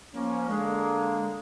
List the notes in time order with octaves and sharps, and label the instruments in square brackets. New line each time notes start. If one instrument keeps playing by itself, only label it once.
[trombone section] F3 C#4 [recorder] A#3
[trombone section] D3 A#3 [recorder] G#3